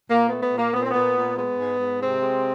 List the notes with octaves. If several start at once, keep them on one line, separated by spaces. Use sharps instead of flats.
A#2 A#3
B3
A3
B3
A#2
A#3
A#2 B3
C4
A#2 B3
A#2
G#3 B3
G#2
G#2
C3 G#3 C4
G#3